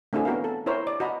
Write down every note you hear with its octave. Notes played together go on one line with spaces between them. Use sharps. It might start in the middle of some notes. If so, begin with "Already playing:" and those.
A3 C4 D4 E4 F#4 G#4
B3 F#4 A#4 F5
A4
E4 A#4 C5 C#5
D5
F#4 D#5 A#5 B5